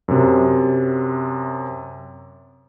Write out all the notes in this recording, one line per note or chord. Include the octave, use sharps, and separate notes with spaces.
F#2 C3